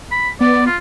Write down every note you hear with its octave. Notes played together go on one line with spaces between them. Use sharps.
B5
B3 D5
F4